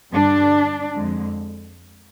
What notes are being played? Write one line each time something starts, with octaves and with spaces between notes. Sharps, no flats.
G2 D3 G3 D4
F2 D3 G#3